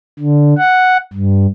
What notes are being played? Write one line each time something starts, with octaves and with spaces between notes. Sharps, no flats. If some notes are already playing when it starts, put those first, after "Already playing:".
D3
F#5
G2